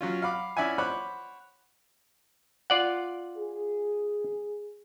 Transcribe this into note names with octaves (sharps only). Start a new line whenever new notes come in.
F#3 C#4 F4
F5 F#5 B5 D6
C#4 E4 D5 E5 F#5 G#5
C5 C#5 F#5 B5 D6 F#6
F4 D5 F#5
G#4